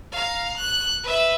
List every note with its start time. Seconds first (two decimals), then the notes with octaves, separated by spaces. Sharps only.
0.12 F5 A#5
0.56 F#6
1.04 B4 E5